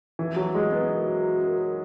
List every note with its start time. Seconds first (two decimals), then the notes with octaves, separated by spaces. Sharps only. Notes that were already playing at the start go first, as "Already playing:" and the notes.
0.19 B2 E3
0.36 B2 F#3
0.54 B2 G#3
0.71 F#3 B3
0.89 F#2
1.06 F#3
1.24 F#3
1.41 F#2
1.58 E3